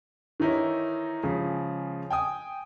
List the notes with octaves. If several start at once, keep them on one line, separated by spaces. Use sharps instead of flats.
D#3 E3 D#4 E4 C#5
C#3 F3 G#3
G5 G#5 D#6